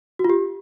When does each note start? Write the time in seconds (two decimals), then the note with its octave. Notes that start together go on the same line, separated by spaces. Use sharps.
0.19 F#4
0.24 F4
0.30 G4